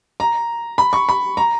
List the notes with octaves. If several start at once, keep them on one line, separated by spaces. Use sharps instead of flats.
A#5
B5
C#6
B5
A#5